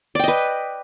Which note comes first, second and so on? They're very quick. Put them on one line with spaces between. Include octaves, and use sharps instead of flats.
D5 G5 D#5 B4